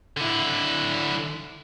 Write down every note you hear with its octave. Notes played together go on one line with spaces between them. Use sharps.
D3 E4